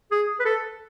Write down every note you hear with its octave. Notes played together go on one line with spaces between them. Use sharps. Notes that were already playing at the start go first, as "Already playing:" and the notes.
G#4
B4
A4